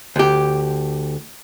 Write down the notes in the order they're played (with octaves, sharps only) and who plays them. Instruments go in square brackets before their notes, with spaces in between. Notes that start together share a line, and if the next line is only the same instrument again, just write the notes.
[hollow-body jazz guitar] D2 G4